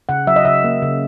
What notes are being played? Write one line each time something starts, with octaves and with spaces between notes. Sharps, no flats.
C#3 F#5
F#3 E5
D#5
C#3 E5
A#3
C#3